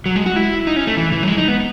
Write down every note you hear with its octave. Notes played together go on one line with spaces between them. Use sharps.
F#3
G#3
F#4
E4
D#4
C#4
A3
E3
E3
F#3
G#3
D#4
B3